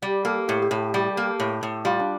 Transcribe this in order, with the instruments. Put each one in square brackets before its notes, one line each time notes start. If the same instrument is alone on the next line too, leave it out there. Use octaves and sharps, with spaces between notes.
[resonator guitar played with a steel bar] G3 [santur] G4
[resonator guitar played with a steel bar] A#3 [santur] A4
[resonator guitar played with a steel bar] A2 [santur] G4
[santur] G4
[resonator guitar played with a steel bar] A2 [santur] A4
[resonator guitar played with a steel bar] G3 [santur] G4
[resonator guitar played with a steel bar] A#3
A2
A2
[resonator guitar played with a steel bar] G3 [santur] F4
[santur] D4